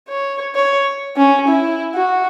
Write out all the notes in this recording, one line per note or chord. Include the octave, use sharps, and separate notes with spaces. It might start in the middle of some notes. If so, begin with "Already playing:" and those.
C#5
C#5
C#4
E4
F#4